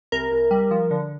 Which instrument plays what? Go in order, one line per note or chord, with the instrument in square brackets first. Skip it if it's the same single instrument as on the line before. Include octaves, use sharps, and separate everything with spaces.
[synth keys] C2 A#4
C2
G3
F3
D3